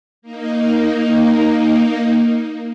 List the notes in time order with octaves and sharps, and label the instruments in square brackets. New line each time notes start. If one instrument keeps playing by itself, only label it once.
[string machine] A#3 D#4